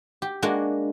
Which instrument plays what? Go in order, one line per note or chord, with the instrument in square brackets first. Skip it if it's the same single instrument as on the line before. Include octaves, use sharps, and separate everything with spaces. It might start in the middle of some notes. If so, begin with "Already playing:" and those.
[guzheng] G4
G#3 A#3 D4 F#4